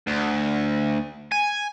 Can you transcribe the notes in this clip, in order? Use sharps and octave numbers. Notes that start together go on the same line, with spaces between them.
D2
G#5